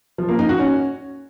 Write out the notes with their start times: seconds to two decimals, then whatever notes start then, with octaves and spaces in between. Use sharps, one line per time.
0.18 F3
0.29 A#3
0.39 D#4
0.49 F#4
0.59 C#4